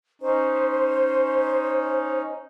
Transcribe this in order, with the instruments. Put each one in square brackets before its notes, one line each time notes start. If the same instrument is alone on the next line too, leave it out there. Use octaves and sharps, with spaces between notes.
[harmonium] C#4 D#4 [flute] C5